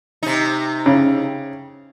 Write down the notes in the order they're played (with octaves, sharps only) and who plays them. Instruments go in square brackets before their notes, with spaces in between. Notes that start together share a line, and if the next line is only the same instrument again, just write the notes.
[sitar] C3 D#4
[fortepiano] C#3